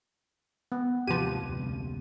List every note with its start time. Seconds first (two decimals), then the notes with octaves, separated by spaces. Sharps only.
0.72 B3
1.07 D#2 G#2 C3 F3 G4 B4 D#7
1.40 F1 D2 C3